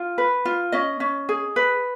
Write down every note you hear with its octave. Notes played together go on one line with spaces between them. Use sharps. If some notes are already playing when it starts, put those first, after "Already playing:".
Already playing: F4
B4
F4
C#4 D#5
C#4
G#4
B4